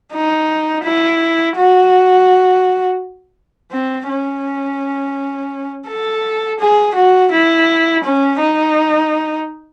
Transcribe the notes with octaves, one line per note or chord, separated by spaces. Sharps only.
D#4
E4
F#4
C4
C#4
A4
G#4
F#4
E4
C#4
D#4